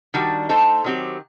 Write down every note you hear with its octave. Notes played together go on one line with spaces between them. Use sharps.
D#3 G3 D4 F#4
A3 D#4 A4 C5
D#3 F#3 C4 G4